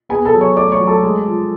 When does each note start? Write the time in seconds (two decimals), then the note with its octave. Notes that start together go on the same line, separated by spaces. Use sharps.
0.09 B3 G#4 G#5
0.25 A4 A5
0.33 F#3
0.41 C#5 C#6
0.56 A3 D5 D6
0.72 C#5 C#6
0.80 F#3
0.87 A4 A5
1.03 G#3
1.26 F3